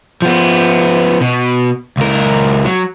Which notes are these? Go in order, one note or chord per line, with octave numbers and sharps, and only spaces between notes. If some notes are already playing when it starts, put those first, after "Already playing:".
F3 B3
B2
C#2 A#4
F#3